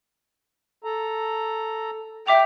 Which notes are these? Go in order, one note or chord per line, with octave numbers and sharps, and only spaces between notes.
A4 A#5
E5 G5 D6 F7